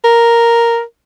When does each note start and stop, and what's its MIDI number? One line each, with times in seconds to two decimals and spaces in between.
0.04 0.81 70